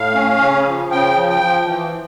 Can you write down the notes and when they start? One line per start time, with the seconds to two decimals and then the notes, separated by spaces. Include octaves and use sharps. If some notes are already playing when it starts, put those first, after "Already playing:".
Already playing: A2 F5
0.15 C#4
0.41 C#3
0.66 F3
0.91 C#3 G5
1.16 F3
1.29 G5
1.41 F3
1.67 E3